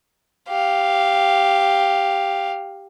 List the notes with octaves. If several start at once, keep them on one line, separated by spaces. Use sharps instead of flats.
G4 F5